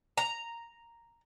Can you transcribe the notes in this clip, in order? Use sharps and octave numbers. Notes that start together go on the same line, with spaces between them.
A#5